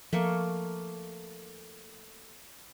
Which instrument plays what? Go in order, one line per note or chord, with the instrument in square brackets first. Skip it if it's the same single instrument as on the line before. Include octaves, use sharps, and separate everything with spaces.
[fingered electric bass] F3 [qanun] A3 A#3 C#6